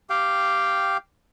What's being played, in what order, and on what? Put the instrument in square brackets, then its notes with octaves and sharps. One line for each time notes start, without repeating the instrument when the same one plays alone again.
[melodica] G4 F5 G5